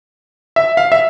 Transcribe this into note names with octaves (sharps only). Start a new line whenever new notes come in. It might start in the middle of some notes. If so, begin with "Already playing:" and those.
E5
F5
E5